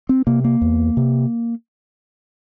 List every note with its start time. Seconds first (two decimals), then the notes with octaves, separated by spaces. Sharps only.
0.09 C4
0.27 C3 A#3
0.44 A#3
0.61 E2
0.97 C3